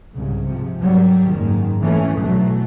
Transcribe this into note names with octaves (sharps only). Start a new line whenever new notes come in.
C2 G#2 C#3
G#2 C3 F3
G#2 F#3 G3
F#1 G#2 D#3
E3 A3 A#3 C#4
B1 B2 E3 F#3 A3